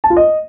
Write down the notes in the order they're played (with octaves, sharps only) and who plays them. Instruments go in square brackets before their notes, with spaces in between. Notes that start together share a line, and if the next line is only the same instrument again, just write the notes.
[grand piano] A5
F4
D#5